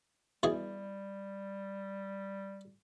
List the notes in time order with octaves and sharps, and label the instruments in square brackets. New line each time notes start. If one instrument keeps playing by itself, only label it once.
[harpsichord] B2 E3 G#4 [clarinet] G3